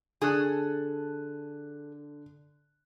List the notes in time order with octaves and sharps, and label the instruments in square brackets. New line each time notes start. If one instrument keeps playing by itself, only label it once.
[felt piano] D3 F#6 [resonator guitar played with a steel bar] G#4 A4